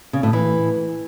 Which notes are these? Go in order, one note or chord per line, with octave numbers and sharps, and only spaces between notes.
C#3
A2
E3